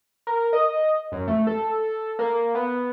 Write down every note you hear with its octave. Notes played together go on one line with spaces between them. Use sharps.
A#4
D#5
F#2
A3
A4
A#3
B3